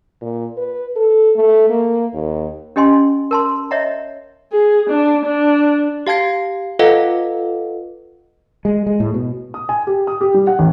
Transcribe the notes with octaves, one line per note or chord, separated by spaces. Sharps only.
A#2
B4
A4
A3
A#3
D#2
C#4 G4 D#5 G#5 C6
A#4 A5 C6
C#5 D#5 E5 F#5 A#5
G#4
D4
D4
G4 F5 A5 G#6 C7
F4 A4 B4 D#5 F5 F#5
G#3
G#3
A2
B2
D#6
G#5
G4
D#6
G4
G3
F#5
A1